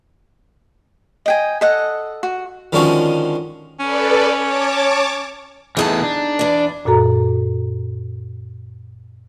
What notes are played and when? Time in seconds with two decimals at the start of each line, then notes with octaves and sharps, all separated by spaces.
1.26 D#5 G5 G#5
1.61 A4 D#5 F#5
2.23 F#4
2.73 D3 D#3 F3 G#3 C#4 F#4
3.80 C#4 A4 B4 D5
4.40 C#5 A5 D6
5.77 E3 A3 B3 D#4 G#4 A5
6.03 D4
6.39 E2 D5
6.85 F#2 A#2 F#4 A4 A#5